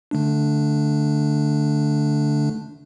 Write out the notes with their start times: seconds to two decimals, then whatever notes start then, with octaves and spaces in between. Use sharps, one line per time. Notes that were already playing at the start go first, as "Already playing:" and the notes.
0.11 D3 A3 D4